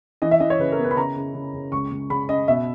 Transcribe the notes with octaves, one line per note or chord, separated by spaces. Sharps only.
E3 D#5
E5
E3 D#5
C#5
C#3 B4
A#4
B3
B4
B5
C#3 A#5
C#3
C#3
C#3
C#2 C#6
C#2
C#3 B5
C#4 D#5
B2 E5